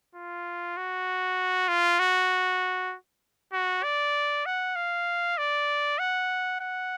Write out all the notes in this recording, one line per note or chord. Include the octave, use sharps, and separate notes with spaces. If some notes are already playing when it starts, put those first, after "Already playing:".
F4
F#4
F4
F#4
F#4
D5
F#5
F5
D5
F#5
F#5